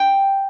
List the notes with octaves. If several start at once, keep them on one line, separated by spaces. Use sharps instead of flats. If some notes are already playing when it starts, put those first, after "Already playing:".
Already playing: G5